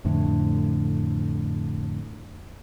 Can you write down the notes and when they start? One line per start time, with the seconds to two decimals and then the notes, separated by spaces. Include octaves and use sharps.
0.05 F2 A2 D3